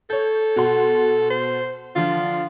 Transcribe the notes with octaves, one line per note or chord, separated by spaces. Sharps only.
A4 C#5 G6
B2 F#4 C6
C5
D3 F3 F4